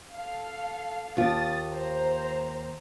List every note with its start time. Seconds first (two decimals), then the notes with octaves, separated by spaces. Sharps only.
0.13 A4 F5
1.17 D#2 F4 A5 D#6 A6
1.72 C5 A#5